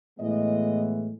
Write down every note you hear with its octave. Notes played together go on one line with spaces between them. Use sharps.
A2 E3 G#3 B3 D#5